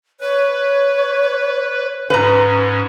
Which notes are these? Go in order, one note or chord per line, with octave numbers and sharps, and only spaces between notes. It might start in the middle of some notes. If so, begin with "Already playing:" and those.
B4 C#5
G#2 C#4 B4 A#5